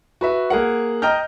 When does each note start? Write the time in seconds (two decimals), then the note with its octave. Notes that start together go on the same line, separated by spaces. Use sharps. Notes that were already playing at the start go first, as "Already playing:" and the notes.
0.21 F#4 B4 E5
0.50 A#3 G#4 A#4 F#5
1.02 D#5 G5 A#5 F6 G6